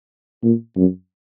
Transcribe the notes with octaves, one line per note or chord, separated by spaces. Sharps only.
A#2
F#2